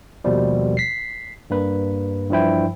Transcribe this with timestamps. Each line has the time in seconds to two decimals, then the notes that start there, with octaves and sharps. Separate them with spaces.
0.24 D#2 B2 F3 G3
0.77 B6 C7
1.50 G2 A#3 B4
2.30 G2 E3 F3 E4 G5